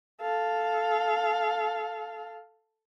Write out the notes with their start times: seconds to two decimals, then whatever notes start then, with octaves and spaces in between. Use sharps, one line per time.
0.21 A4 F5